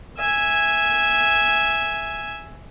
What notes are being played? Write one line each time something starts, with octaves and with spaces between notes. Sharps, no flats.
E5 G#5